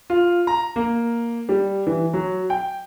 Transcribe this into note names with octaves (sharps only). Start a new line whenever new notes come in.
F4
A#5
A#3
G3
E3
F#3
G5